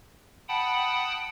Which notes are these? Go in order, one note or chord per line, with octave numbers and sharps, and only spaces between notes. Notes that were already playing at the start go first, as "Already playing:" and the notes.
F#5 G5 A5 B5 D#6